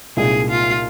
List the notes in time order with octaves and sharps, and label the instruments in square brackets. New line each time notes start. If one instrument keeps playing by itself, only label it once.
[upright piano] C2 A#2 G#3 D#4 [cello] G#4
[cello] F4